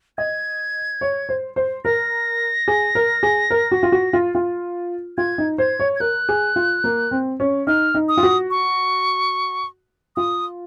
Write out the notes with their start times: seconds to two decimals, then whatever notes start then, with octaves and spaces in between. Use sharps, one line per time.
0.18 D#5 G#6
1.01 C#5
1.29 C5
1.56 C5
1.85 A#4 A#6
2.68 G#4
2.95 A#4
3.23 G#4
3.50 A#4
3.71 F#4
3.83 F4
3.92 F#4
4.13 F4
4.35 F4
5.18 F4 G#6
5.38 D#4
5.58 C5 G#6
5.80 C#5
5.96 G#6
6.00 A#4 F#6
6.29 G#4
6.56 F4
6.84 A#3
7.11 C4
7.40 C#4
7.67 D#4 F6
7.94 D#4
8.09 D#6
8.17 F4
8.23 F#4
8.50 C#6
10.16 F4 D#6